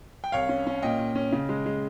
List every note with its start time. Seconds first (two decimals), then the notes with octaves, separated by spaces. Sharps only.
0.24 G5
0.32 C2 C#5 F5
0.49 C#4
0.67 C#4
0.83 A#2 D#5 G5
0.99 A#2
1.15 C#4
1.32 C#3
1.49 G#3
1.66 G#3